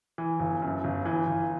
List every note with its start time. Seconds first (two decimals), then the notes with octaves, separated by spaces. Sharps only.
0.18 E3
0.39 G1
0.62 F#2
0.84 G1
1.06 E3
1.27 G1